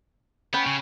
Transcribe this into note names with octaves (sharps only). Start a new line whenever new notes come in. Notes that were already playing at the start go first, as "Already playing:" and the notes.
B3 C#4 G5 B5
C#3